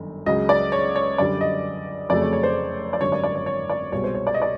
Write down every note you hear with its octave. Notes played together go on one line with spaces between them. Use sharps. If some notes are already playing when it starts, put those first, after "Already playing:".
Already playing: G1 F#2 D#3
C#2 C#3 F#3 D#5
D5
C#5
C#5
F#2 D3 G3 D5
D#5
F1 F2 C#3 F#3 A3 D5
C#5
C#5
C5
D5
G#1 F#2 D3 G3 C#5
D5
D5
C#5
C#5
D5
C2 B2 G#3 C#5
C5
C#5
D5
D#5
D5